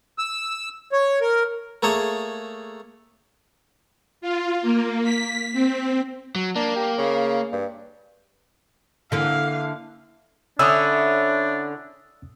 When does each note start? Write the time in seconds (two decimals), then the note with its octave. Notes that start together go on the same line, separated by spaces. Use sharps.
0.18 E6
0.92 C#5
1.21 A#4
1.83 A3 A#3 G#4 A4 C#5
4.21 F4
4.62 A#3
5.04 B6
5.53 C4
6.35 F#3
6.56 A#3 D4
6.76 G4
6.98 C#3
7.52 G2
9.12 D3 E3 A#3 F5
10.59 D3 C#4 D4 E4 D#6 E6